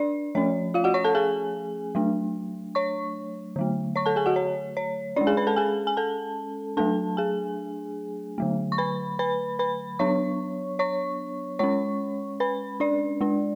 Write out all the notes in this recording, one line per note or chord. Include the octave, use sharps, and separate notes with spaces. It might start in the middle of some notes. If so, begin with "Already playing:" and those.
Already playing: D4 D5
F3 A3 C#4 C#5
F4 F5
F#4 F#5
C#5 C#6
A4 A5
G#4 G#5
F#3 A3 D4
C#5 C#6
D3 F#3 A3
C#5 C#6
A4 A5
G#4 G#5
F#4 F#5
C#5
C#5
G#3 C#4 D4 D5
G#4 G#5
B4 B5
A4 A5
G#4 G#5
G#5
A4 A5
F#3 A3 D4 A4 A5
G#4 G#5
D3 F#3 A3
C#6
B4 B5
B4 B5
B4 B5
F#3 B3 D4 C#5 C#6
C#5 C#6
G#3 C#4 C#5 C#6
B4 B5
D4 D5
G#3 D4